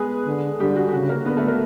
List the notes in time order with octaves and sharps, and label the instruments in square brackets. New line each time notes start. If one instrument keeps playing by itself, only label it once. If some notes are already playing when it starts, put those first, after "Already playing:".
Already playing: [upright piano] G#3 B3 G#4 B4
[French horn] D3
[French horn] D3 [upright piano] G3 G4
[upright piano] F#4
G4
[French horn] C#3 [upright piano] F#4
[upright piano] A#3 A#4
[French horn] D3 [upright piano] B3 B4
[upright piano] A3 A4
A#3 A#4